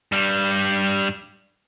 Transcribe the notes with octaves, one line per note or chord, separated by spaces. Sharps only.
G2 G3